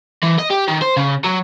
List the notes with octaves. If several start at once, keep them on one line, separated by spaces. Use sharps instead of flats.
E3
D#5
G4
D#3
C5
C#3
F#3